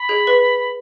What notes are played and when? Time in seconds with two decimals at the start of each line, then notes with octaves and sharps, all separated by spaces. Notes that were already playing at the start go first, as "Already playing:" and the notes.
Already playing: B5
0.09 G#4
0.27 B4